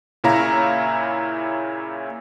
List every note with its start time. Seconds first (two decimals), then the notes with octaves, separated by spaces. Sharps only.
0.24 A#2 C#3 E4 C#5 F5 A#5